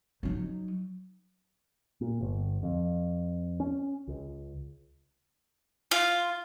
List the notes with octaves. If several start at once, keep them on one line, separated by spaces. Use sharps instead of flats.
F#3 D#4
A#2
G1
F2
C#4
C#2
F4